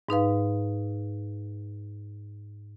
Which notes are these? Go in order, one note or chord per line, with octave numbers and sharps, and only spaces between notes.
G#2 D#4 B4 F5